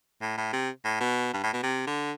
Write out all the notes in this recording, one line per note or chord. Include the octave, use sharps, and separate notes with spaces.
A2
A2
C3
A2
B2
G2
A2
B2
C3
D3